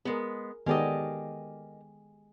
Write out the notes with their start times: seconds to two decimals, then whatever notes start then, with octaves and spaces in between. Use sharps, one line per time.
0.05 G#3 B3 G#4 A#4
0.66 D#3 G#3 B3 G4 A4 A#4 D5 D#5